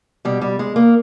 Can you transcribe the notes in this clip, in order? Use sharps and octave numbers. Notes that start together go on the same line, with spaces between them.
B2 G3
G3
G#3
A#3